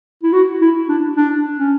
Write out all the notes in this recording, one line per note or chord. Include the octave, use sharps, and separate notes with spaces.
E4
F#4
E4
D4
D4
C#4